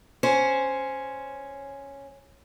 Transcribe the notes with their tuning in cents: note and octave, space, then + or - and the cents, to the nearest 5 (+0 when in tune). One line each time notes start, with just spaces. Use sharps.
C#4 +0 C5 +0